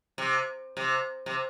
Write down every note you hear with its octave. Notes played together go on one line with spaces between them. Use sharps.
C3
C3
C3